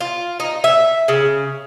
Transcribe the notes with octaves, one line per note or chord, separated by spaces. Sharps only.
F4
D#4
E5
C#3